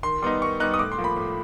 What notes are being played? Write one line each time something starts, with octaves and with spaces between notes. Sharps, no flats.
D#3 C6
G3 B3 D#4 C6
D#3 C#6
G3 B3 D#4 F#6
D#6
A2 D6
C6
F3 A#3
B5
A2